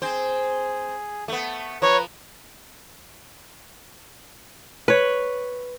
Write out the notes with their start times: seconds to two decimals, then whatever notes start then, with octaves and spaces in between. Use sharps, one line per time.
0.02 C4 G#4 C5
1.28 A3 B3
1.82 F3 B4 C#5 A#5
4.88 B4 C#5